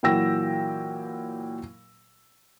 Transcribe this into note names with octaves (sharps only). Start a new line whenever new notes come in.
A#2 E3 F#3 G5 E6 A#6